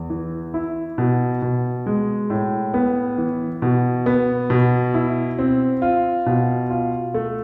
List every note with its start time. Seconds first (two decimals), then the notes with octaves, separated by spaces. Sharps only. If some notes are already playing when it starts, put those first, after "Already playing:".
Already playing: E2
0.10 E3
0.54 E4
0.98 B2
1.42 B2
1.86 G#3
2.30 A2
2.74 B3
3.18 E3
3.62 B2
4.06 B3
4.50 B2
4.94 E4
5.38 C4
5.82 F4
6.26 B2
6.70 F4
7.14 A3